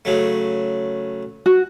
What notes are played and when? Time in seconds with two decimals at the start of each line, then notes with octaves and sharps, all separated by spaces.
0.05 C#3 F#3 A3
1.46 F#4